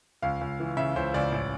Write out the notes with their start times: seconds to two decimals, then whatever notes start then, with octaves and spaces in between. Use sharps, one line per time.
0.22 C#2 F5
0.41 C#2
0.60 E3
0.77 C#3 E5
0.96 C#2 C5
1.14 C#2 D5
1.32 A1